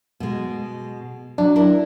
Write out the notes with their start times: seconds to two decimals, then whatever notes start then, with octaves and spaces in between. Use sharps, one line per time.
0.20 B2 G#3
1.38 F#3 D4
1.56 E4 A#4